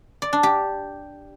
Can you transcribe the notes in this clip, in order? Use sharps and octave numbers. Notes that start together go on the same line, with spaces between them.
D5
D4
G4